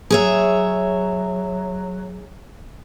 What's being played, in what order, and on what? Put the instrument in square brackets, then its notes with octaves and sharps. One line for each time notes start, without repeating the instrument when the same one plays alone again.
[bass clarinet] F#3 [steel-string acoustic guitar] G#4 C#5 E5